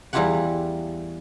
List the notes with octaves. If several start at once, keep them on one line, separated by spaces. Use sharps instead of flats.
E2 G3 E4 F4 G4 F#5